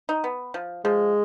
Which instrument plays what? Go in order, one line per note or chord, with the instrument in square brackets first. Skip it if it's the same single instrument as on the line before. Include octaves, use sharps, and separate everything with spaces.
[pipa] D#4
B3
F3
[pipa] F3 [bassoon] G#3